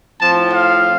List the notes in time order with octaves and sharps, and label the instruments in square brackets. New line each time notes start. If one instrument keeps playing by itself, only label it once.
[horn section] A2 F3 C4 A5
F5